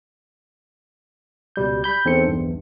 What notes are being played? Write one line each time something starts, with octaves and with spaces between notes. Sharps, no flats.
C#2 B2 G3 G6
B5 G6
E2 C4 D#4 A4 C5 C#7
B1 E2 G2